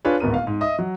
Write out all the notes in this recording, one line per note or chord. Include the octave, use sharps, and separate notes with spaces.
D4 F4 G#4 B4 C#5
D1 G#1 B3 A#4 D#7
F5
G#2
D#5 E5 D#6
F#3